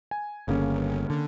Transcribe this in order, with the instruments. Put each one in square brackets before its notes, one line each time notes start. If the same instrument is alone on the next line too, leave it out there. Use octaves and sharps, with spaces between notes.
[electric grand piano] G#5
[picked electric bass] G1 [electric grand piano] C#3 A#3 C#4
[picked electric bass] D3